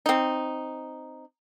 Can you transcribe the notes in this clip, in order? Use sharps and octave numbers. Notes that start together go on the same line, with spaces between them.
C4 D#4